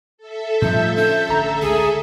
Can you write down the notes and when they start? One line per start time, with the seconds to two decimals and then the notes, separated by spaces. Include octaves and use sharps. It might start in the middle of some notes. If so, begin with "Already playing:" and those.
0.18 A4 E5
0.62 A2 C#3 F3 G3 D#4 F4 G6
0.97 C#4 D4 G6
1.29 A1 D3 A#5
1.62 C#2 G#4